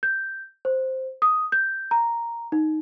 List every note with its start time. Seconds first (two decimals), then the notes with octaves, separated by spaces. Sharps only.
0.03 G6
0.65 C5
1.22 D#6
1.52 G6
1.91 A#5
2.52 D#4